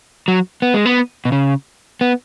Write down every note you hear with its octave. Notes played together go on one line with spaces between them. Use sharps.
F#3
B3
G#3
B3
B2
C#3
B3